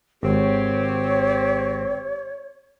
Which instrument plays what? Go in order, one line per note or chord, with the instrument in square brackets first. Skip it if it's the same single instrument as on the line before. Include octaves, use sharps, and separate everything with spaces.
[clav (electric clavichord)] G#1 [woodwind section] C4 G4 [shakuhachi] C#5